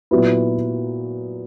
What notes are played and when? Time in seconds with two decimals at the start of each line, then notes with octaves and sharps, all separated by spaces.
0.11 A#2 F#3 B3 E4 B4